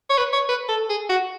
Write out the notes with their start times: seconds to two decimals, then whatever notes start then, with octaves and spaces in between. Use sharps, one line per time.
0.10 C#5
0.18 B4
0.33 C#5
0.48 B4
0.69 A4
0.89 G#4
1.09 F#4